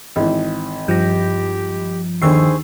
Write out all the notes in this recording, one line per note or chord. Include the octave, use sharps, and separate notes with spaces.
G#1 E3
G2 F3 G4 G6 A#6
D#2 D3 D#3 G#4 C5 C#6 E6 C7